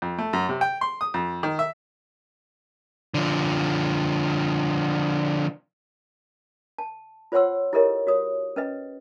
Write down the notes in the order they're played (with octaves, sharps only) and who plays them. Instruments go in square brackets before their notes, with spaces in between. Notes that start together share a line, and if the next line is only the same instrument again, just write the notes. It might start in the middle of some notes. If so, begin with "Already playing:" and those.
[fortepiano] F2
A3
F#2
C3
G5
C6
D#6
F2
D#3
E5
[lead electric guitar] D3 F3
[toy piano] A5
F4 C5 C#5 F#5 C6 E6
E4 G4 A4 A#4 C#5 D#5
F#4 C#5 D#6
C#4 B4 D#5